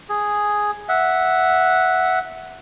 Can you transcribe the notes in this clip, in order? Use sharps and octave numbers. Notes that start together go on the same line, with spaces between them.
G#4
E5 F#5